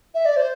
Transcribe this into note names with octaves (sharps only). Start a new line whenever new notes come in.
E5
D5
C5